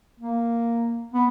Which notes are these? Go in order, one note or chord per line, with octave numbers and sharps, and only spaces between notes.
A#3
B3